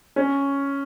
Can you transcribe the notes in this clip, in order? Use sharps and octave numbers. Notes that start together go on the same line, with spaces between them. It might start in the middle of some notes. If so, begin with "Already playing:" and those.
C#4